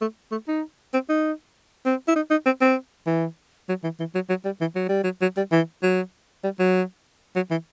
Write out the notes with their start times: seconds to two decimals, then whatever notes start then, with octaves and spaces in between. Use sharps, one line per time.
0.01 A3
0.31 A3
0.48 D#4
0.93 C4
1.09 D#4
1.85 C4
2.08 E4
2.16 D#4
2.31 D#4
2.46 C4
2.61 C4
3.07 E3
3.69 F#3
3.83 E3
4.00 E3
4.15 F#3
4.29 F#3
4.45 G3
4.61 E3
4.75 F#3
4.89 G3
5.04 F#3
5.21 F#3
5.37 G3
5.52 E3
5.82 F#3
6.44 G3
6.59 F#3
7.35 F#3
7.51 E3